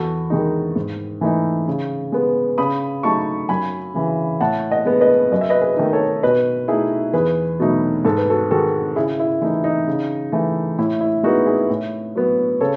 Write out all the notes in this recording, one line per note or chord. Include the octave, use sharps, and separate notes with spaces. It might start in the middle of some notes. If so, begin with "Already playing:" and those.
Already playing: E2 F#4 A4
D#3 G#3 D#4
G#2
E3 A3 D#4
C#3
G#3 B3
C#3 B5 D#6
F#3 A3 D#4 A5 C#6
F#2 G#5 B5
C#3 E3
A2 F#5 A5
D#5 F#5
G#3 B3
B4 D#5
F#2 D#5
E5
B4 D#5
G#4 B4
D#3 A3 D#4
A4 C#5
B2 B4 D#5
A3 D#4 E4 G#4
E2 G#4 B4
B2 F#3 A3 D#4
G#2 A4
B4
F#4 A4
D#3 G#3 F#4 A4
C#3 E4 G#4
E4
E3 A3 D#4 E4
D#4
C#3
E3 A3
A2 E4
E4
G#3 B3 D#4 F#4
E4 G#4
A2
F#3 B3
C#3 A4 C#5